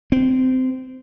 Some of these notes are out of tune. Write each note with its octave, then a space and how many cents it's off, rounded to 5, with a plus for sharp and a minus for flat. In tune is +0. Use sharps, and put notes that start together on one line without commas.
C4 -20